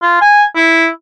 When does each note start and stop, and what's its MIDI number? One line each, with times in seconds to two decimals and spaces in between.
0.02 0.17 65
0.21 0.43 80
0.55 0.87 64